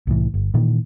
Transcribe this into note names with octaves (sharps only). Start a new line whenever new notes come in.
C2 A2 E3
G1
A#2 D#3 E3